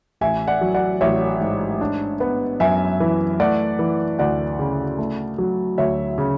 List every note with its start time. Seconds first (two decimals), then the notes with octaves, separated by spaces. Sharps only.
0.21 A1 E5 G#5
0.48 D5 F#5
0.61 F#3
0.74 D5 F#5
1.01 A1 C#5 E5
1.41 G#2
1.81 D4
2.20 B3
2.60 F#2 E5 G#5
3.00 E3
3.40 A3 D5 F#5
3.79 E3
4.19 D2 D5 F#5
4.59 C#3
4.98 A3
5.38 F#3
5.78 D2 C#5 E5
6.18 C#3